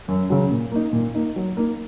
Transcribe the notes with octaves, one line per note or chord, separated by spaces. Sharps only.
F#2
C#3 F#3
A#2
A#3 D#4
A#2
A#3 D#4
F#3
A#3 D#4